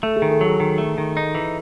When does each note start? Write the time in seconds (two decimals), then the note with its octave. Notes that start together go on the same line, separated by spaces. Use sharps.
0.03 A3 A4
0.17 G#4
0.22 D#3
0.31 A4
0.41 F#3 G#4
0.60 D#3
0.78 A3
0.98 D#3
1.17 D#4
1.35 E3